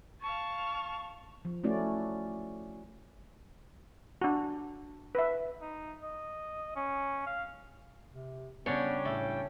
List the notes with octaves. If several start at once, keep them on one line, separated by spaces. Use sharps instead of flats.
F5 A5 C#6
F3
A3 C#4 E4 F#4 D5
D4 F#4
B4 E5
D#4
D#5
C#4
F5
C3
C#3 G3 B3 C#4 D4 C#5 G5
A2 A3